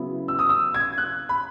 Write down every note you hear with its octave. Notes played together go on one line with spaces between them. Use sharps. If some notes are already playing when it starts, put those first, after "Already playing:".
Already playing: C#3 F#3 B3 E4
E6
D#6
E6
G#6
F#6
B5